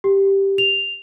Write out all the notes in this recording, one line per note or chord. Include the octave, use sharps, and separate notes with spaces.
G4
F7